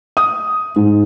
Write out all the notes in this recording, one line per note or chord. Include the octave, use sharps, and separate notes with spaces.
D#6
G#2